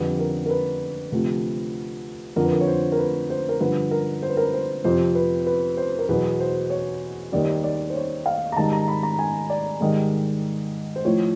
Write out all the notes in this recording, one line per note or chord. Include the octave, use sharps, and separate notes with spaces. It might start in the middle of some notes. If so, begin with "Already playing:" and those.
Already playing: F2 D3 G3 B4
A#4
A#4
B4
D2 C3 F3
F2 D3 F3 A#4
B4
A#4
C#5
C5
A#4
B4
C5
A#4
G2 D3 F3 B4
A#4
C5
B4
A#4
B4
C5
F2 C3 F3 C5
B4
B4
C5
A#4
E2 B2 F#3 B4
C5
C#5
D#2 D#3 G3 D5
D5
C5
C#5
F5
A#5
G#2 D#3 G3 A5
A#5
B5
A#5
G#5
D5
G#2 D#3 G3
C5
A2 F3 C#5